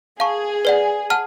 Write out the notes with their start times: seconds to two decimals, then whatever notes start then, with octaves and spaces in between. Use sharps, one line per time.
0.20 G#4 F5 A5 C#6
0.65 B4 D5 F#5
1.10 F#5 A5 F6